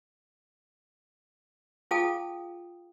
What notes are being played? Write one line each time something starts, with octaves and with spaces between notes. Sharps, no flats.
F4 G#4 F5 G5 A5 D#6